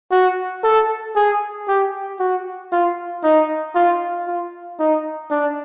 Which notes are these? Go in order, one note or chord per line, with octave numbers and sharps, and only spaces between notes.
F#4
A4
G#4
G4
F#4
F4
D#4
F4
F4
D#4
D4